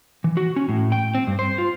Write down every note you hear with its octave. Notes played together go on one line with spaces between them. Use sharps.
E3
F#4
C#4
A2
G5
C4
G2
C5
F4